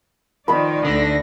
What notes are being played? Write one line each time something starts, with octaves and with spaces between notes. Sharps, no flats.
D#3 F3 D#4 B4 D5 B5
D2 D3 A#6